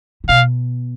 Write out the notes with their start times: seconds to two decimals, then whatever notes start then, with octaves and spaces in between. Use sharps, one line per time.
0.24 C#3
0.29 B2 F5